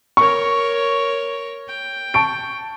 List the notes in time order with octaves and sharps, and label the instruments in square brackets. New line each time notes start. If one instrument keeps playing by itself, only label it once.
[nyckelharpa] A#4 C#5 [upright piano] C#6
[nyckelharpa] G5
[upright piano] A5 C#6 D7